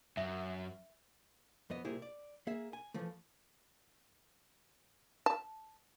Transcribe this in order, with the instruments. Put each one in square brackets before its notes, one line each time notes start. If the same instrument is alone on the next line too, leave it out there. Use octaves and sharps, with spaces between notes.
[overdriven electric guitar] F#2 [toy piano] E5
[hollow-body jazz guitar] F2 B3 D#5
C2 A#2 E4 G4 G#4
D5
A#3 G#4 E5
G#5
E3 F3 A3
[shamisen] A5